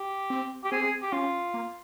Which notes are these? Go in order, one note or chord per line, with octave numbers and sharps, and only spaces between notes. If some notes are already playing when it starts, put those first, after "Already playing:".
Already playing: G4
C4
G4
C4 G#4
G#4
G4
C#4 F4
A#3